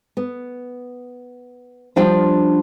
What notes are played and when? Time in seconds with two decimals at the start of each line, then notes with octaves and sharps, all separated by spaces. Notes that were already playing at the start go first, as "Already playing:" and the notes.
0.17 B3
1.96 F3 G3 D4 F4 G5